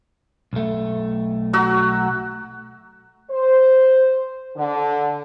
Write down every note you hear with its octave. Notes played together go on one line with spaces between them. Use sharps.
B1 A3
F#3 F#4 E6
C5
D3